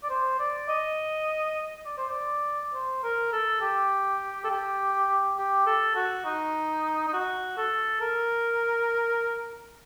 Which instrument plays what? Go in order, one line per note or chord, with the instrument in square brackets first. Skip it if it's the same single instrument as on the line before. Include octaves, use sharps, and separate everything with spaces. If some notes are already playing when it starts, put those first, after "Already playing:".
[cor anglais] D5
C5
D5
D#5
D5
C5
D5
C5
A#4
A4
G4
A4
G4
G4
A4
F#4
D#4
D#4
F#4
A4
A#4